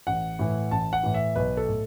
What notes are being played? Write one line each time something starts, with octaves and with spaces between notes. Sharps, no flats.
A1 F#5
A2 E3
A1 A5
F#5
A2 E3
E5
B1 B4
A4
A2